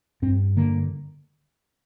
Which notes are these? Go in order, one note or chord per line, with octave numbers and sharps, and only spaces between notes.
G2 C4
D3 A#3